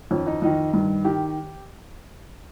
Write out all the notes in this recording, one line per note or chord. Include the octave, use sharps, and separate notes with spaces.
F2 D#3 C#4
D#4
F2 D#3 D#4
G2 D#3
D#3 G4